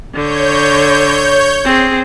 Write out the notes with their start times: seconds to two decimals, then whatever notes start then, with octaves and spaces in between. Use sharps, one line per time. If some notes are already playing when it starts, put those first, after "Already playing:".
0.14 D3 C#5 G6
1.65 C4 G#4